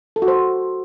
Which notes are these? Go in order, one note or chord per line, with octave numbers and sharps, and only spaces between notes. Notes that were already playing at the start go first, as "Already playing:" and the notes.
A4
F#4
C5